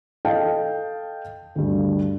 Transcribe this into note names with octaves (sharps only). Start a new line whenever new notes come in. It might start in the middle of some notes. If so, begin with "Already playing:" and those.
A4 D#5 F5 G5 A5
D2 G2